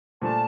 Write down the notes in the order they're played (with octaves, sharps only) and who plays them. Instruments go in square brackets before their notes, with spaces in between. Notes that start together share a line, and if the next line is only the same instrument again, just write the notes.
[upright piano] A#2 F3 A3 D4 [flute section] A5